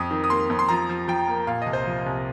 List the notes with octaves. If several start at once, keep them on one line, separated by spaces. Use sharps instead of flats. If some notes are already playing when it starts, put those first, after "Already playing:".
Already playing: F2 D#6
D#3
D#6
A#3 C6
F2
C6
F3 A#5
F3
F3 G5
A#3
A#2 F5
C2 D#5
C5
F3
C2